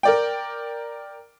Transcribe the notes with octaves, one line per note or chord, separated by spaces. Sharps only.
A#4 D5 G5